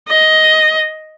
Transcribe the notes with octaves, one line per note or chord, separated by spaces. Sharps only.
D#5